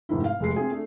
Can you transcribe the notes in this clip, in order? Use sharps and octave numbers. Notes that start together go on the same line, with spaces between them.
F1 G#2 D#3 E4
F5
F1 G#3 C7
C4 F4 G#4
A3 D4